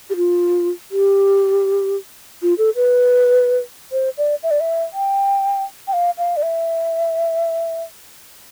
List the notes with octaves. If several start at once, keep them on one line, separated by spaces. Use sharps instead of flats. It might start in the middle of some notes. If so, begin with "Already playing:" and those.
G4
F4
G4
F4
A4
B4
C5
D5
E5
D5
E5
G5
G5
F5
F5
D5
E5